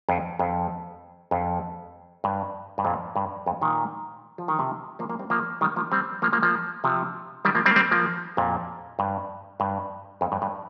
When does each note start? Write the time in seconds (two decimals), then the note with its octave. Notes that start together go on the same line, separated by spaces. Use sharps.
0.09 F2
0.39 F2
1.31 F2
2.24 G2
2.78 G2
2.85 F2 A#2
3.16 G2
3.46 F2
3.61 A#2 D#3
4.38 F3
4.48 D#3
4.59 C3 F3
4.99 F3 A#3
5.10 F3 A#3
5.19 G3 C4
5.30 F3 A#3
5.61 D#3 G3
5.76 F3 A#3
5.92 G3 C4
6.22 F3 A#3
6.33 F3 A#3
6.43 F3 A#3
6.84 C3 F3
7.45 D#3 G3
7.55 F3 A#3
7.66 G3 C4
7.71 A#3
7.76 G3 C4
7.91 F3 A#3
8.37 F2 A#2
8.99 G2
9.60 G2
10.21 F2
10.32 G2
10.42 G2